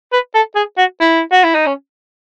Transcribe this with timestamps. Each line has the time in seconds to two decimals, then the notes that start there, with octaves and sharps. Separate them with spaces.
0.13 B4
0.35 A4
0.56 G#4
0.78 F#4
1.01 E4
1.32 F#4
1.44 E4
1.55 D#4
1.67 C#4